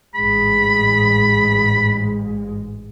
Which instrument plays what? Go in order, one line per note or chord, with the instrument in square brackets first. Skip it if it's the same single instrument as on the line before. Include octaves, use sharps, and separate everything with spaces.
[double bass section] A1 G#2 G#3 [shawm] B5